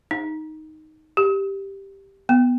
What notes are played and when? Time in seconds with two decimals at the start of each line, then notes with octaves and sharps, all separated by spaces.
0.11 D#4
1.17 G4
2.29 B3